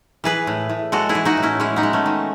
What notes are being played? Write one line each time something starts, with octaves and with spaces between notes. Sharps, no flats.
E3 G#4 B4
A2
A2
G#3 F#4 A4
E4 G#4
E3
D#4 F#4
A2
C#4 E4
G#3 C#4 E4
B3 D#4
G#3
A3 C#4
D#3